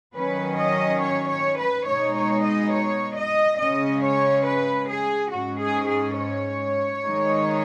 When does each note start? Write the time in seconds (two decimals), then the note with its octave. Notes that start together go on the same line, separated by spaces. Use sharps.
0.15 D#3 F#3 C#4 B4
0.58 D#5
1.01 C#5
1.30 C#5
1.58 B4
1.87 B2 G#3 D#4 C#5
2.16 C#5
2.44 D#5
2.73 C#5
3.16 D#5
3.59 C#3 G#3 C#4 D#5
4.03 C#5
4.46 B4
4.89 G#4
5.32 G#2 G#3 C#4 F#4
5.60 G#4
5.89 G#4
6.18 C#5
7.04 D#3 G#3 D#4